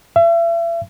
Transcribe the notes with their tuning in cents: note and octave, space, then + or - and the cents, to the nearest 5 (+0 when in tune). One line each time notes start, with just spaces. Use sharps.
E5 +40